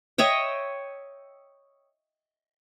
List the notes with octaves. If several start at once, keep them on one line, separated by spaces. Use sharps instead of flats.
C#5 D#5 E5 G5